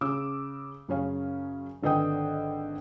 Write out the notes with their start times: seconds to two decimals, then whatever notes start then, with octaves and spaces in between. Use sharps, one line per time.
0.01 C#3 D6 E6
0.88 F#2 C#3 C#4 F5
1.83 G#1 D3 B4 D#5 G5 D#6